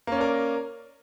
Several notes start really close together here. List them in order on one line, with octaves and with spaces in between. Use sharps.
A#3 C#4 D5 A#4